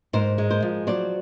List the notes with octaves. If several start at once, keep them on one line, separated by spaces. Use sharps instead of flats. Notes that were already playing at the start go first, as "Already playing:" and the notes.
G#2 A#4 C5
G#3
A#4 C5
F3
F#3 C5 D5